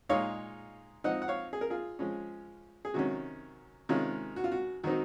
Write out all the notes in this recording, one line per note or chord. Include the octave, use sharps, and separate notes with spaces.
A#2 G#3 D#4 C#5 F5
F3 C4 D#4 D#5 F#5
F#5
C#5 F5
G#4
A#4
F4 G#4
F3 G#3 C#4
G#4
C3 D#3 F#3 C#4 F#4
C3 D#3 G#3 C#4 F4
F#4
F4
F#4
D#3 F#3 C4 D#4 F#4